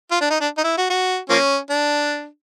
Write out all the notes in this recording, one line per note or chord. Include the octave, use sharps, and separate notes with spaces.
F4
D4
D#4
D4
D#4
E4
F#4
F#4
F3 A#3 C#4
D4